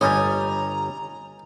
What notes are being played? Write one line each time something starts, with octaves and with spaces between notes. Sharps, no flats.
G1 G3 C#5 D#5 G#5 A#5